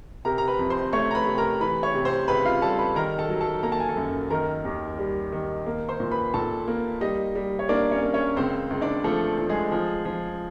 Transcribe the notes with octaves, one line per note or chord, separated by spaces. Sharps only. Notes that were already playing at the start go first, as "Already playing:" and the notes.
C3 A#4 A#5
A#5
B4 B5
F2
C5 C6
A3 C#5 C#6
A#5
B4 B5
C3
A#4 A#5
E3 B4 B5
C#5 C#6
C3
C5 C6
C#2 B4 B5
F4 F5
G3 A4 A5
B4 B5
D#3 A#4 A#5
A4 A5
F#3
A4 A5
A#3 A#5
A5
G#5
A4 A5
F#2
D#3 A#4 A#5
D#2
G3
D#3
A#3
C5 C6
A#2
B4 B5
A#2 A4 A5
A#3
G3 D#4 D#5
G3
C#5
A#3 D4 D5
C#4 C#5
A#3
C#4 C#5
C#2 C4 C5
C#2
D4 D5
F3 A3 A4
F3
G#3 G#4
F3
F3